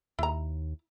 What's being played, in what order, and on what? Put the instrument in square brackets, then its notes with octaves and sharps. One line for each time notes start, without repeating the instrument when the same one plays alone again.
[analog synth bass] D#2 [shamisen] E4 A#5